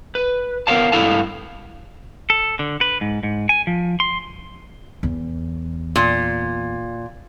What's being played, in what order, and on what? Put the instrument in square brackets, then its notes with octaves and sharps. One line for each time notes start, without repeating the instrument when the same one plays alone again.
[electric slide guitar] B4
B3 A#4 C5 C#5 F5 A5
G2 A3 E4 A4 F5 A5
[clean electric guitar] A4
D3
B4
G#2
G#2
G#5
F3
C6
[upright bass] E2
[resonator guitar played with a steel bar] A#2